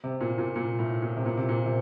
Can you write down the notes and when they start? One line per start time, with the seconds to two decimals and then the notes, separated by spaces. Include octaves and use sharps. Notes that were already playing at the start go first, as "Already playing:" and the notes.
0.04 C3
0.21 A#2
0.38 A#2
0.56 A#2
0.79 A2
1.02 A#2
1.17 C3
1.26 A#2
1.37 C3
1.49 A#2
1.66 C3